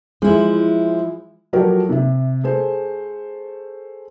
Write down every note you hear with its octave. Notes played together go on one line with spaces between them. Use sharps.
F3 G#3 E4
F3 F#3 A3 G4 A#4 C#5
C3 E5
A3 G#4 C5